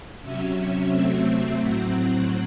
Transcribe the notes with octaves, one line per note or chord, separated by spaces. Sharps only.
C3 F#3 C#4 E5
C3 F#3 A3 C4
A2 F#3 C4 F#5